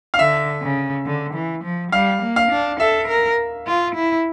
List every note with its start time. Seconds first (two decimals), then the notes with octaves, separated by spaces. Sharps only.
0.14 F5
0.19 D3 E5
0.62 C#3
1.06 D3
1.34 E3
1.64 F3
1.92 G3 F5
2.22 A#3
2.36 F5
2.51 D4
2.80 A4 E5
3.08 A#4
3.67 F4
3.95 E4